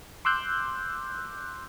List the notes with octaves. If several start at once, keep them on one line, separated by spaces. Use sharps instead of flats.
C6 D6 E6 F#6 G6